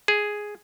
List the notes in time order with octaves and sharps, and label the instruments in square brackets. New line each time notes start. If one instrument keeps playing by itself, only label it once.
[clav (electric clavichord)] G#4